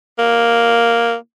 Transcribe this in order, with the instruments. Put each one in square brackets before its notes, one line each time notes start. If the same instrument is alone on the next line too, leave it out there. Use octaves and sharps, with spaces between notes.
[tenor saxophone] A#3